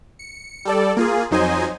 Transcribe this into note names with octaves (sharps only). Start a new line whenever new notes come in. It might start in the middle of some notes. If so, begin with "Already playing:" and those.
C#7
G3 A4 D5
A#3 F4 G#4
F2 F#3 D#4 C5 D#5 G#5